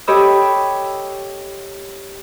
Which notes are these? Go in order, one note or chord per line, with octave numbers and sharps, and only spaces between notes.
G4 A4 C#5 D#5 B5 E6